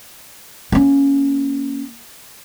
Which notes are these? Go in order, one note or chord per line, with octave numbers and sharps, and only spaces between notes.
A#3 C#4